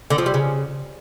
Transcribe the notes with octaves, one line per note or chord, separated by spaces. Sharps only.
D3
F3
G3
C#3